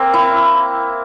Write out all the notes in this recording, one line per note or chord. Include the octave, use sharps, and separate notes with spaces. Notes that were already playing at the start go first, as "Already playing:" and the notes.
Already playing: A#3 C4
E4